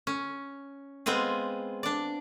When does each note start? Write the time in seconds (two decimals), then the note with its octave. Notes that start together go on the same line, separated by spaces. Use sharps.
0.07 C#4
1.06 G#3 B3 C4 F4 G#4
1.83 D4 D5